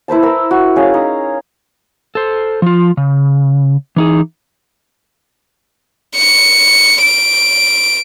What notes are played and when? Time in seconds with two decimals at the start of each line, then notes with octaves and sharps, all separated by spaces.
0.08 E4 B4 C5 A5
0.23 A#4 E6
0.51 F#4
0.76 C#4 G#4 F5
0.94 D#4
2.15 A4 C5
2.62 F3 F4
2.97 C#3
3.96 E3 D#4 G#4
6.16 C#7
7.02 D7